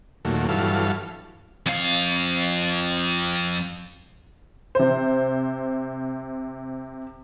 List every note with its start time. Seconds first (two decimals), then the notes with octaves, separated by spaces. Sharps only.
0.25 D#2 A#2 F#3 A3
0.49 G2 E3 F#3 A4 F5
1.66 F2 F5
4.75 C3 C5